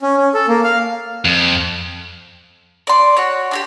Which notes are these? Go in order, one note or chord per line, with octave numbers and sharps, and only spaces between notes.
C#4
C#4
A4
A#3
F5
F2
D5 C6
F#4 C#5
D4 F#4 G4